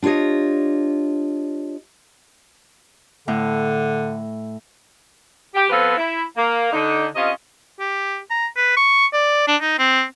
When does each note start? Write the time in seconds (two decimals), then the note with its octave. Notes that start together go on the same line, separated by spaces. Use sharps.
0.03 D4 F4 G4 C#5 D#5
3.28 A2 D3
5.55 G4
5.70 F3 B3 C4 F4 A4 B4
5.98 E4
6.36 A#3
6.72 D3 D#4
7.16 C3 C#4 F4 D#5
7.80 G4
8.30 A#5
8.57 B4
8.77 C#6
9.13 D5
9.48 D4
9.61 D#4
9.79 C4